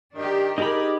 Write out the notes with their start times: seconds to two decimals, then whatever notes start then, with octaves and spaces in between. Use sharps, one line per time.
0.15 D#3 D4 G4
0.58 D#4 G4 G#4 A#4 D5 B5